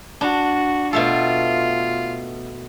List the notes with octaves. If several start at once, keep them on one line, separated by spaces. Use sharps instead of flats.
D4 F#4
B2 A3 F4 A4